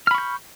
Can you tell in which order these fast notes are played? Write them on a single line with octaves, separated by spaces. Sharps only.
F6 B5 C#6 G6